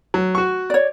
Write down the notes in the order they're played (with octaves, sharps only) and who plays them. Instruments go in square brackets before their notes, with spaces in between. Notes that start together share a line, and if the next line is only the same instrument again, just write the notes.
[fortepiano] F#3
F#4 C#6
[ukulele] C#5 D5